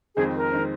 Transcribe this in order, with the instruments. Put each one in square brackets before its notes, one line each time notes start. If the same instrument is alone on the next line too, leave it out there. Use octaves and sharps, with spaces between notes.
[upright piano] F2 D#3 G#3 C4 [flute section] G#4
[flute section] A#4
[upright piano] D#3 G#3 C4